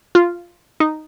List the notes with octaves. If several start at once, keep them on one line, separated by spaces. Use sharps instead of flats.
F4
D#4